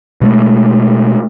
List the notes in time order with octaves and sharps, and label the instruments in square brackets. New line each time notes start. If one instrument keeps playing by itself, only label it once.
[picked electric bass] B2 G#3 A3